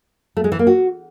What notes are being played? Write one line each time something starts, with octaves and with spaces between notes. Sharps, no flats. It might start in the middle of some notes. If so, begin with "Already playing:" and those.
A3
G#3
E3
A#3
F#4